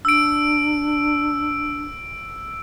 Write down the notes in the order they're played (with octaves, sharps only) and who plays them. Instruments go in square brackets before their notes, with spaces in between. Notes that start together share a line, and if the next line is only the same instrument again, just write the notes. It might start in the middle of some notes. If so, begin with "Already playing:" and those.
[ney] D4 [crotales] E6 D7